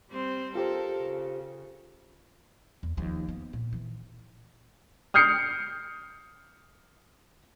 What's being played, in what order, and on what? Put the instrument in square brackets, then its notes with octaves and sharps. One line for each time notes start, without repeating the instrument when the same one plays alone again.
[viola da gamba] G3 C4 C5
[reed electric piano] F4 G4 C5 [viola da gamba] A4 A#4
[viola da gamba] C#3
[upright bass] E2
D#2 F3
B3
A#2
E3
[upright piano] D#6 F6 G6 C7 C#7